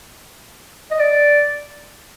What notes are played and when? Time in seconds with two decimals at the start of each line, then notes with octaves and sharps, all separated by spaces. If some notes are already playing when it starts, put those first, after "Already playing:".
0.91 D#5
0.99 D5